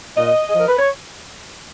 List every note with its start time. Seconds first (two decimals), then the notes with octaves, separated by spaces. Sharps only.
0.17 A#2 D#5
0.48 G#4
0.53 F3
0.58 A#4
0.68 B4
0.79 C#5